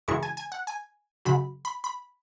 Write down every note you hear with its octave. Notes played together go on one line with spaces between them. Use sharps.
F#2 C#3 E3 G#3 C#6
G#5
G#5
F#5
G#5
F#2 C#3 F#3 B5
B5
B5